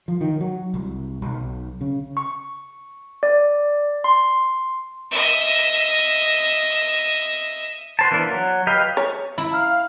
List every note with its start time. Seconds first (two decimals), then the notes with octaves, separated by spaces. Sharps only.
0.08 F3
0.21 D#3
0.40 F#3
0.74 C2
1.22 B1
1.81 C#3
2.17 C#6
3.23 D5
4.04 C6
5.11 D#5 E5
7.99 F#4 C5 A5
8.11 E3 A#3 B3 D4
8.29 F#3
8.67 G4 B4 D#5 F5
8.97 C#5
9.38 E4 B5
9.51 F5 A#5 F6